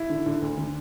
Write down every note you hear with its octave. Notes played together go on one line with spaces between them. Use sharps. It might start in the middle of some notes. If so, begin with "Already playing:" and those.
Already playing: E4
D3
D3
D2
D3